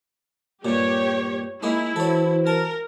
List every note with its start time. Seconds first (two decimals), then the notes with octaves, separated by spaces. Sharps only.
0.65 G2 A#2 G4 C#5
1.63 G#3 A#3 D#4 E4
1.96 E3 F#4 A4 C5 C#5
2.47 A#4 A5